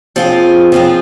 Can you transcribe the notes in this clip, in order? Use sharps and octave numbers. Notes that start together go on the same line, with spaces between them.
F3 C4 F4 G#4
F3 C4 F4 G#4